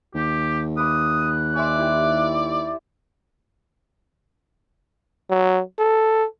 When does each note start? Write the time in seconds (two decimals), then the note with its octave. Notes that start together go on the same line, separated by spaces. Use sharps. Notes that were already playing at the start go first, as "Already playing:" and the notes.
0.15 D#2 G4
0.77 B4 D6 D#6 F#6
1.56 C5 D5 E5 G#5
1.77 E4 G4
5.30 F#3
5.79 A4